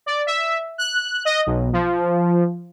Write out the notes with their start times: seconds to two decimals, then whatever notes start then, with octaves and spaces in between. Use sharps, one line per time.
0.06 D5
0.27 E5
0.78 F#6
1.25 D#5
1.46 B1
1.73 F3